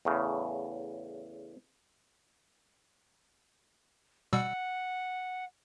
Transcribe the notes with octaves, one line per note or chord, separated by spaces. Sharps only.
E2 A2 C#3
B2 G3 F#5 E6